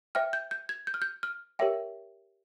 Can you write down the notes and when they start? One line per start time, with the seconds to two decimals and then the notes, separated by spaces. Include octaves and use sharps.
0.15 C5 E5 G5 F6
0.33 G6
0.51 G6
0.69 G#6
0.87 G6
0.94 F6
1.02 G6
1.23 F6
1.59 G4 A#4 C#5 E5 G5